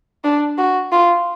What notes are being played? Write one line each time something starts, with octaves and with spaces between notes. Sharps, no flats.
D4
F#4
F4